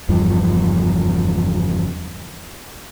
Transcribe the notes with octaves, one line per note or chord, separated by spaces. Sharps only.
F#1 E2 G2 F3